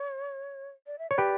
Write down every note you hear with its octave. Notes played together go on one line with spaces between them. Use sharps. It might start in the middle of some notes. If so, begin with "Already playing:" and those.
Already playing: C#5
D5
E5
C#5 D5
G4 B4